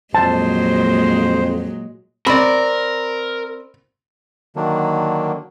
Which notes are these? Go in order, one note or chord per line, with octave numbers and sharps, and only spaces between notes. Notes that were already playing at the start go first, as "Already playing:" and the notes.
F2 A#2 F#3 G#3 C5 A5
C4 A#4 D5 B5
D3 D#3 F#3 A#3 D4